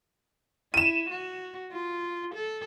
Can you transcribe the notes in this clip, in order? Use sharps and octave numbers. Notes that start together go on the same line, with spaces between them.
E4 D#7 E7
F#4
F4
A4